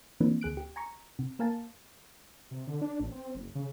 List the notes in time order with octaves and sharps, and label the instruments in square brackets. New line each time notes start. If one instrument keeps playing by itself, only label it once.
[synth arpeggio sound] E3 F3 A#3 C4 D4
D2 G#4 F#6 D7
G4
G#5 A#5 C#6
C3
A#3 A#4 F5 G#5 A5
[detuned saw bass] C3
D3
D4
A1
C4
F#1
C#3